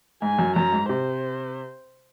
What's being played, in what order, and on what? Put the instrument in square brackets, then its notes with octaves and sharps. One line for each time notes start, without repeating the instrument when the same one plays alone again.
[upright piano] G#2 [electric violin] G#5
[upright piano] F#2
[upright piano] F#2 [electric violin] A#5
[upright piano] G#2
[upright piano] C3 [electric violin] C5